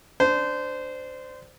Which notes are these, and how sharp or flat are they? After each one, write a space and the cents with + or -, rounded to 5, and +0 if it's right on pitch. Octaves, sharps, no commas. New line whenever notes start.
D4 +0 C5 -20